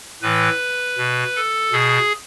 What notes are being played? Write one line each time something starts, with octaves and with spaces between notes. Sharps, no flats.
A2 E3 B4
B2
A4
B2 G#4